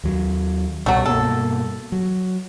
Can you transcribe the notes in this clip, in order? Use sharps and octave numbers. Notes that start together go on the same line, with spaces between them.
D#2 F#3
C2 B2 F#3 G3 A3
G2 B2 A#3 A4
F#3